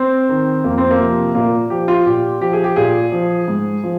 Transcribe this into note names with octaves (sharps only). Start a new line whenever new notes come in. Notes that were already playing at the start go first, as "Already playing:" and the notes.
Already playing: C4
D#3
F2 A#3
C4
A#3
C3 F3
A#2 A#3
F3 G4
F4
A#2 G4
F3 G4
G#4
G4
A#2 G#4
F3
G#2
F3